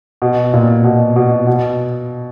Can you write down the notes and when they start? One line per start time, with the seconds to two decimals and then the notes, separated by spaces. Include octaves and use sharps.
0.22 B2
0.53 A#2
0.84 B2
1.16 B2
1.47 B2